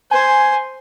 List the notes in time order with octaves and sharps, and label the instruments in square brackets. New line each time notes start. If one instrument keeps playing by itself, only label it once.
[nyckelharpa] C5 [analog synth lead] G#5